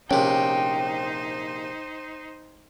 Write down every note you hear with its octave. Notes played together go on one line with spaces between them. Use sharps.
A#1 C3 C#4 D#4 C5 G5